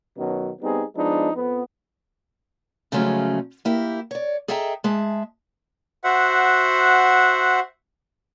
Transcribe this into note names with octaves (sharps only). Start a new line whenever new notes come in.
F#2 B2 D#3 F#3
G3 B3 C4 D#4 G#4
F3 G#3 B3 D4 D#4
F2 B3
C#3 F3 F#3 G#3 A3 C#4
A#3 E4 G4
C#5 D5
G#4 A4 D#5 E5 G5 A#5
G#3 G#4 E5 A5
F#4 C5 E5 F#5